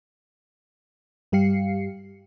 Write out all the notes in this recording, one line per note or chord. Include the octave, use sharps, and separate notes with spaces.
G2 G3 G4 F5 C7 C#7